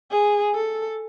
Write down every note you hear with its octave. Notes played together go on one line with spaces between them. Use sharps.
G#4
A4